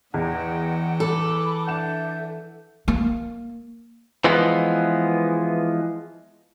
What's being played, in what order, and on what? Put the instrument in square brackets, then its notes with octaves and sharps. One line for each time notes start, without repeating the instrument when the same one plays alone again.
[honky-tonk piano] E2 [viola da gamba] E3 [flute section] D#5 F#5 G5
[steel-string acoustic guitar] A4 [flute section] B5 D6
[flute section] D4 E5 G6 [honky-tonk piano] F#5 E7
[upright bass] A#3
[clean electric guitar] E3 F3 G#3 B3